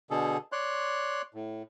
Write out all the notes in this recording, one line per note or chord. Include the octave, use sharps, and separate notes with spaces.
B2 D3 G#4 A4
C#5 D5 C6 F#6
A2